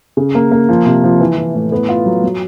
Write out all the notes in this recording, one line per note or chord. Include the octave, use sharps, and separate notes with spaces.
C#3
A#3
A#3
F3
C3
F3
E3
E3
A2
B3
F4
F#3
F#3